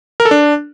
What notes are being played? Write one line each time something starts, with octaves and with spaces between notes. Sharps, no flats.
A#4
A4
D4